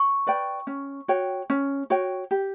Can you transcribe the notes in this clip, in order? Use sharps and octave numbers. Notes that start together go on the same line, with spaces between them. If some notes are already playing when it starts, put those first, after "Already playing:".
Already playing: C#6
B4 D5 G5
C#4
F#4 C#5 G5
C#4
F#4 C#5 G5
G4